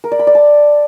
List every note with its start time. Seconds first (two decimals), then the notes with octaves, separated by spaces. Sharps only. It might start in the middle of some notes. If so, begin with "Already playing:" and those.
0.04 A#4
0.12 D5
0.19 B5
0.27 D5
0.35 A5